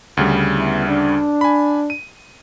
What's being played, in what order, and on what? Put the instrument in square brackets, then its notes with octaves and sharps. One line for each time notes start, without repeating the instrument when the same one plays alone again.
[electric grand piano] D2 C#3 G3
[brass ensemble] B3 E4
D4
[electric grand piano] G#5 B5
D#7